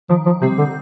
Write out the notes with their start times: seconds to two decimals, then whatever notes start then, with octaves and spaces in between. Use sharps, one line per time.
0.10 D#3 F3
0.26 F3
0.42 C3 G3 C4
0.58 D3